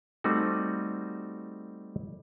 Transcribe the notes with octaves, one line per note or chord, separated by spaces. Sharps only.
G3 A3 C4 D#4 F#4